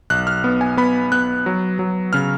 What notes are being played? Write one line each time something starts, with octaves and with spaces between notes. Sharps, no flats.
B1 F#6
F6
B3
G#5
B3 B5
B3 F#6
F#3
F#3
C#3 F6